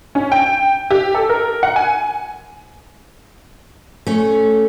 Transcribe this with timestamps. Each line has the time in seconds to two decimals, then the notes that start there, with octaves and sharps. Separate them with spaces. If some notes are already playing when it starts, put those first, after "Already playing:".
0.15 C#4
0.32 G5
0.91 G4
1.14 A4
1.29 A#4
1.63 F#5
1.76 G#5
4.07 A3 C#4